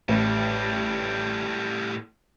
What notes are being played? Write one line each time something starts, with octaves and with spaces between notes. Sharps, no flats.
A1 A2 G3